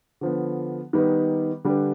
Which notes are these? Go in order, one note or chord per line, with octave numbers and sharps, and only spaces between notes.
D3 F3 B3
D#3 G3 B3 D#4 B4
D3 G3 D4 G4 B4